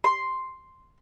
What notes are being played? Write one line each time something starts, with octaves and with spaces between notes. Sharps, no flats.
C6